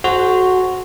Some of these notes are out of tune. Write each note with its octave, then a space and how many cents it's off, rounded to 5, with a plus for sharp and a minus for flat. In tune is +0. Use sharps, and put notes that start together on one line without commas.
F#4 +0 A4 -45 C5 +0